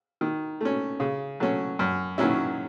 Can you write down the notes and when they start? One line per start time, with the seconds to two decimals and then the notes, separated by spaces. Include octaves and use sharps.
0.21 D#3
0.61 A3 C#4
1.00 C#3
1.40 F#3 A3 C#4
1.79 F#2
2.18 D#3 F#3 C#4 E4